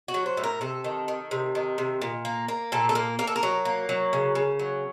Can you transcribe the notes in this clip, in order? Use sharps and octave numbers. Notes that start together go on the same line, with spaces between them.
F#4
F#3
C5
A2
A#4
C3 A4
D#3
D#3
C3
D#3
C3
A#2
A#3
A#3
A#2 A4
A4
A#3 A#4
A#3 A#4
A4
A#4
F#3
A#3
F#3
C#3
C#3
F#3